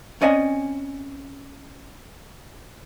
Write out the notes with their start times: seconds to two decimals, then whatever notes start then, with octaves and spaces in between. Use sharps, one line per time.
0.21 C4 C#4 D5 D#5 F#5 G#5